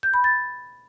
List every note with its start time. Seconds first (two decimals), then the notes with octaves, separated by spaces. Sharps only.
0.03 G6
0.14 B5
0.24 A6